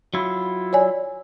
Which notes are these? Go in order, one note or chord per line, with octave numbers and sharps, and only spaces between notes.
F#3 E4 F4
C#5 D5 G#5